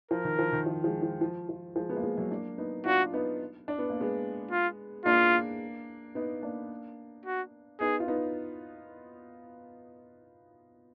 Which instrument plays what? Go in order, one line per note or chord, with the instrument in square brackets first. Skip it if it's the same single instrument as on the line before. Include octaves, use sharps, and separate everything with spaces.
[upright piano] F3 [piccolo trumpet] A#4
[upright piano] D#3
F3
D#3
F3
F3 G#3
F3
F3
F3
F3 G#3
G#3 B3
A#3
G#3 B3
F#3 A#3
A#3 D4
B3 D#4
[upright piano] D4 F4 [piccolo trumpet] F#4
[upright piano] B3 D#4
D4
B3
A#3
G#3 B3
[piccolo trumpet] F4
[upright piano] A#3 D4 [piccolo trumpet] F4
[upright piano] B3 D#4
A#3 D4
[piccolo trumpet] F#4
[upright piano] B3 D#4 [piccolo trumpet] G#4
[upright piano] F4
B3 D#4